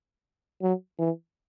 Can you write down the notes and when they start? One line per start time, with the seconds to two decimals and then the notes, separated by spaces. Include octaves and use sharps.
0.62 F#3
0.99 E3